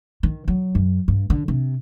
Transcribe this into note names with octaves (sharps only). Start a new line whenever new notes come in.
D#3
F#3
F#2
G2
D3
C3